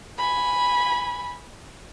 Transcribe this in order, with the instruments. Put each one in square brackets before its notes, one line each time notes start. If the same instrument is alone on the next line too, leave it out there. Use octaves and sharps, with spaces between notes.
[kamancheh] G#5 B5